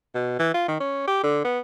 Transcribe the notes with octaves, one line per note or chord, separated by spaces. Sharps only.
B2
E3
F4
D#3
C#4
G4
D3
B3